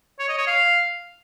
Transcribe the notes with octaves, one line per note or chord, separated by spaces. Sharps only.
C#5
D#5
C#5
F5